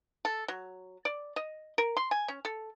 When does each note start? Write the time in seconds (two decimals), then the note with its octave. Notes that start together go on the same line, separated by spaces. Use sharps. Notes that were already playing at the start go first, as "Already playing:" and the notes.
0.25 A4
0.48 F#3
1.05 D5
1.36 D#5
1.78 A#4
1.97 C6
2.11 G#5
2.28 C#4
2.45 A4